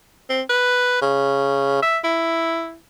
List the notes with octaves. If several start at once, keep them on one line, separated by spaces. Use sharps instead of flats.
C4
B4
C#3
E5
E4